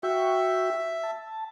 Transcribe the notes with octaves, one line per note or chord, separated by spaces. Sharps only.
F#4 E5 G5 C#6
A5